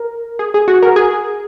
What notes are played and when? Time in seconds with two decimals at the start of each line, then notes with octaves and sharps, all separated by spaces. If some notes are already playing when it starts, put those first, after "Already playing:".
Already playing: A#4
0.39 G#4
0.54 G#4
0.68 F#4
0.82 A#4
0.96 G#4